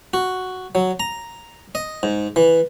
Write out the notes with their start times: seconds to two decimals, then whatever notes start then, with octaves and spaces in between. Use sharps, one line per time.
0.14 F#4
0.75 F#3
1.00 A#5
1.75 D#5
2.03 G#2
2.36 E3